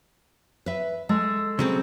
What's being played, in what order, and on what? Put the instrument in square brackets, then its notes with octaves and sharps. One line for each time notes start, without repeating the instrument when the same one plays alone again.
[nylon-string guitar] B4 E5
[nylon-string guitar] G#3 [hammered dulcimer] A4
[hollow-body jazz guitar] C#3 F#3 C4